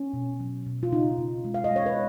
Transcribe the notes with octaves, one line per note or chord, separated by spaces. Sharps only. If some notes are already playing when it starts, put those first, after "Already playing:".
Already playing: C#4
B2
F#3
B2
F4
C#3 D#4
C#3
G#3
F5
D#5
G#3 C#5
B4